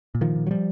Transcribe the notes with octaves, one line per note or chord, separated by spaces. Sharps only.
A#2
D#3 F3
A#2
F#3
F3 G3